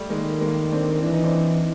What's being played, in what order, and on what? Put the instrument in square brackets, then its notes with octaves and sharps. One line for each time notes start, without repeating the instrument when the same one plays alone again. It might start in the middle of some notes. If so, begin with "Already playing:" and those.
Already playing: [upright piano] G3 A3
[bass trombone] D#3 [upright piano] G#3 A#3
[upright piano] G#3 A#3
C4 D4
[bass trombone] E3 [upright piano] D4
[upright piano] D#4
C4 D4